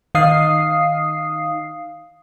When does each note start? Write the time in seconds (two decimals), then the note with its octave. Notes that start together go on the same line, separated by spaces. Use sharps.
0.15 D#3 D#4 F5 D#6 C7